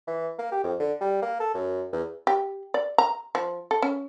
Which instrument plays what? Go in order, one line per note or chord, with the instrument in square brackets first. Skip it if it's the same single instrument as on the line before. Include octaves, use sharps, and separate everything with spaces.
[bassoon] E3
A#3
G4
F2
D3
G3
A#3
A4
F#2
E2
[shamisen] G4
D5
A#5
F3
A4
C#4